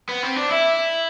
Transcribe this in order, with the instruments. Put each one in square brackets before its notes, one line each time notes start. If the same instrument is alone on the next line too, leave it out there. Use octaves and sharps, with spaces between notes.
[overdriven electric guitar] B3
C4
D4
[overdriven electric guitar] E4 [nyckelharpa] E5